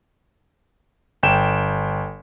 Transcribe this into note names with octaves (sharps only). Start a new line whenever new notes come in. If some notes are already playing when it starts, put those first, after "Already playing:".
G1 G5 E7